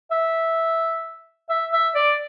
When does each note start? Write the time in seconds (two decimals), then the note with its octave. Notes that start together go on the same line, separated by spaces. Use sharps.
0.11 E5
1.49 E5
1.72 E5
1.95 D5